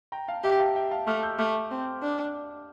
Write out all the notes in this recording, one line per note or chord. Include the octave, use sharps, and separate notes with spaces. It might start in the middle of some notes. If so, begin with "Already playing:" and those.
G5 A#5
F5 A5
G4 E5 G5
F5 A5
E5 G5
F5 A5
A3 D6 F6
E6 G6
A3 D6 F6
C4
D4